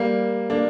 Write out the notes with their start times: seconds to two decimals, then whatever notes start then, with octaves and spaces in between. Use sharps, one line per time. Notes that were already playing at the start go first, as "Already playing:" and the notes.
Already playing: G3 A#3
0.50 A#3 D4